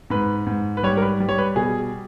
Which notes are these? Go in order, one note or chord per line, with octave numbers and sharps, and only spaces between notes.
G#2 B4
G#2
B4
G3 C#5
A#4
B4
G3
C#5
B4
B2 G#4